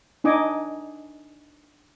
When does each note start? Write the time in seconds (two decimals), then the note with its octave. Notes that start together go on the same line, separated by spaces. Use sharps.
0.24 D4 D#4 D#5 G#5 D6